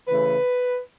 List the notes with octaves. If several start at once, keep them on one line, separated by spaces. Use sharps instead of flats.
C#3 E3 A3 B4